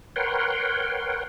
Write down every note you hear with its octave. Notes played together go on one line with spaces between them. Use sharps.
A#4 B4 C#5 F#5 G5 C6